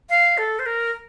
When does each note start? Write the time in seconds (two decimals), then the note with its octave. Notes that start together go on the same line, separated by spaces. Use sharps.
0.09 F5
0.38 A4
0.59 C5
0.66 A#4